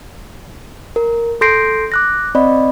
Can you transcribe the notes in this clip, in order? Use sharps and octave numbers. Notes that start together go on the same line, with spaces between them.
A#4
A4 C6 G6 A#6 C7 D7
D6 F#6 A#6
C4 D5 D#5 B5